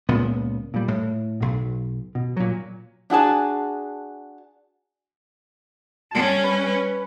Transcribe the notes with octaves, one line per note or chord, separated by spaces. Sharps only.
C#2 A#2 B3
A#2 G3
A2
B1 B2
B2
A#2 F#3
D4 F#4 G#4 A5
G3 C#4 A5
B4